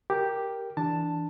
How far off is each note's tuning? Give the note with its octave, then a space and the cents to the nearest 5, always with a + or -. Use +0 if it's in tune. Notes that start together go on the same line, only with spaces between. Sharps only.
G4 +0 A#4 +0
E3 +0 D4 +0 A5 +5